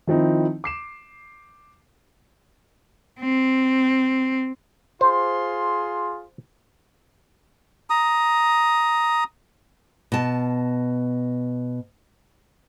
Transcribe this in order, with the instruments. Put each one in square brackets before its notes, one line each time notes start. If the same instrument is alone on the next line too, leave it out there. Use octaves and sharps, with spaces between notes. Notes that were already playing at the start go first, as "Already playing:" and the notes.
[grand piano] D#3 F3 C4 D#4 E4
D6 C7 E7
[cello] C4
[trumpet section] F4 G#4 C6 [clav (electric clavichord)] C5
[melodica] A#5 D#6
[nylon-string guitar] B2 A5